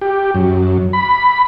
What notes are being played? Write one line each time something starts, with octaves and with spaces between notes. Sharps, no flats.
G4
F#2
B5